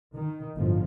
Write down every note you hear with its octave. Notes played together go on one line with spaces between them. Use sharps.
D#3
G1 A2 F3